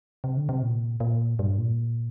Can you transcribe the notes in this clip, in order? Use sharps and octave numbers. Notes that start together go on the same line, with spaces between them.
C3
D3
C3
A#2
A#2
G2
A#2